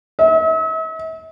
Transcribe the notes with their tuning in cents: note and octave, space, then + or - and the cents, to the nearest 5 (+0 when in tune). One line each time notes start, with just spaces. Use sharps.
E5 -45